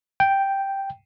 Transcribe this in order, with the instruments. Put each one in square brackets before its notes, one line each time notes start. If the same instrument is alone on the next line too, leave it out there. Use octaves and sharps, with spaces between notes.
[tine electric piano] G5